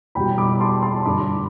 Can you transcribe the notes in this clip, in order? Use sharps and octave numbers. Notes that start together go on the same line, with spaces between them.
E2 B2 G3 G5 B5
B5 D6
A5 C6
A5 C6
G2 D3 G3 B5 D6